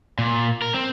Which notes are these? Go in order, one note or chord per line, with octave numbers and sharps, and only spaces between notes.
A#2
A#4
C4